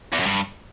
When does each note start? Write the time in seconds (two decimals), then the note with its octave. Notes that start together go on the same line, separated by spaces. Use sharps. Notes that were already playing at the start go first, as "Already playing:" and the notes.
0.13 E2
0.20 F#2
0.26 G2